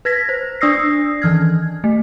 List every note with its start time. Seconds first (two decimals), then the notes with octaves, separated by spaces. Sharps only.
0.05 B4 G#6 A#6 B6
0.29 C5
0.61 D4 D5 D#6 E6 A#6 C7
1.22 D#3 E3 F6 G#6
1.84 A3